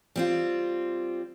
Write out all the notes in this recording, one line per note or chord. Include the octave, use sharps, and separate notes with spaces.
G3 C4 F4